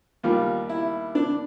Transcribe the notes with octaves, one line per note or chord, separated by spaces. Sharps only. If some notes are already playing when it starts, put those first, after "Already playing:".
D#2 D#3 G3 F4
E4
D4